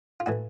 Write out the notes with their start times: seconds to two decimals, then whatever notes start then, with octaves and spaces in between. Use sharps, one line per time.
0.20 F4
0.26 A2 E3 F#4